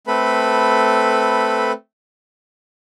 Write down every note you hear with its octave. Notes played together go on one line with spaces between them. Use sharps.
A3 C4 A4 B4 B5